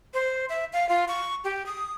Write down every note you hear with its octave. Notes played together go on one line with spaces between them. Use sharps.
C5
E5
F5
F4
C#6
G4
D#6